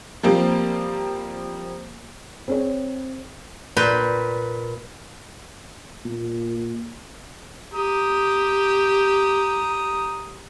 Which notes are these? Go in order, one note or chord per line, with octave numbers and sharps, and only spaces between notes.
F3 G3 A#3 C4
C4 G#4 C#5
A#2 B4 G5
A#2
G4 A#5 D#6